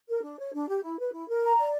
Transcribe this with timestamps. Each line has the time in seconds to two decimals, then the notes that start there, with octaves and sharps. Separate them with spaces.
0.08 A#4
0.23 D4
0.38 C#5
0.53 D4
0.68 G4
0.83 E4
0.98 B4
1.12 E4
1.28 A#4
1.43 A#5
1.58 D5